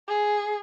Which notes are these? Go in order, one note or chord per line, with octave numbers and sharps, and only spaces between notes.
G#4